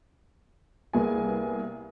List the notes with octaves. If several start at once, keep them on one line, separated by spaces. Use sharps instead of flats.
C2 A#3 B3 G#4 G#5